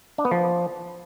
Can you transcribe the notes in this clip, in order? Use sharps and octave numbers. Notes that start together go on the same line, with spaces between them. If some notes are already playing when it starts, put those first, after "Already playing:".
D4
B3
F3